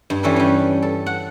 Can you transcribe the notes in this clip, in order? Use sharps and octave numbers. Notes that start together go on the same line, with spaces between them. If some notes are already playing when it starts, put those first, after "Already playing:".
G2
E3 G3 C#4 A4 B4
G3 C#4
A4
F#5